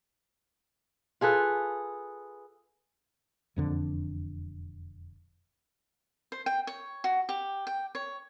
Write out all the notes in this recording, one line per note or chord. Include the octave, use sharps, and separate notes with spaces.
F4 G#4 A4 B4
E1 F2 D3
C5
G5
C#5
F#4
G4
G5
C#5